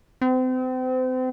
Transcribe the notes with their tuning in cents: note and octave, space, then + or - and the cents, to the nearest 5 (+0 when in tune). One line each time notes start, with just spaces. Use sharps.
C4 -35